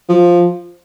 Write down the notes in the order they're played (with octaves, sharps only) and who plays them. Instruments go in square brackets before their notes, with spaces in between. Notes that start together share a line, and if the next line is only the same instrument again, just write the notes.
[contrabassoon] F3